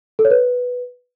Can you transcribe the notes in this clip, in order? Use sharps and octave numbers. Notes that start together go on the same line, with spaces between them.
A4
C#5
B4